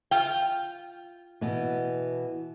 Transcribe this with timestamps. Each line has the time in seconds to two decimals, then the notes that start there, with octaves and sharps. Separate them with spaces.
0.11 F4 G5
1.41 B2 E3